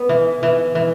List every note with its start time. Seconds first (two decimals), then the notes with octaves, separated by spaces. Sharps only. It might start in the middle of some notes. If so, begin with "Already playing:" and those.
Already playing: B3
0.09 E3
0.43 E3
0.75 E3